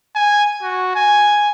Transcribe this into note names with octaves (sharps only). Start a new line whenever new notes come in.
G#5
F#4
G#5